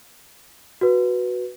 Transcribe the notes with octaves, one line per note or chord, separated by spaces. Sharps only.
F#4 B4